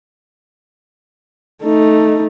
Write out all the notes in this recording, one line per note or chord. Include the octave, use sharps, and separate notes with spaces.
A3 D#4